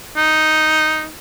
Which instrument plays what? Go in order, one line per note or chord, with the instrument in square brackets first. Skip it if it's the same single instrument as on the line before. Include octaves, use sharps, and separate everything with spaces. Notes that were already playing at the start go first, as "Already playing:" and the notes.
[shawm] D#4